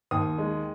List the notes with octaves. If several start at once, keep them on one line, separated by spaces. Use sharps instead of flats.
D#2 D#6
G#3